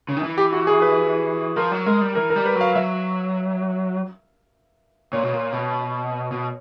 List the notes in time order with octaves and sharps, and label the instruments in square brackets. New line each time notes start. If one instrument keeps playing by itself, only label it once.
[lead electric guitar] C#3
D#3
E3
[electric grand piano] G4
F#4
G#4
B4
[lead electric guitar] F3 [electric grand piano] A#4
[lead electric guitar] F#3
[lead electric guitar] G#3 [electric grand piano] A#4
[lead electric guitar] G3
[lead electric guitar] E3 [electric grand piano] A#4
[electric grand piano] A#4
[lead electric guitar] G3
[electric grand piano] B4
[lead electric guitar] F#3
[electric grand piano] F5
[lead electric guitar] F#3 [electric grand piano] E5
[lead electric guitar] A#2 [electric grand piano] C#5
[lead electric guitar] B2
A#2
B2
B2